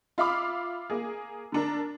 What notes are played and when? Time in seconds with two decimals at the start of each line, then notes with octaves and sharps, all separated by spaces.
0.18 F4 E5 F5 B5 D6
0.90 A#3 G#4
1.52 D3 D4 A#4